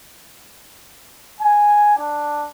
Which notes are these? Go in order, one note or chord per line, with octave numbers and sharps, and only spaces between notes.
G#5
D4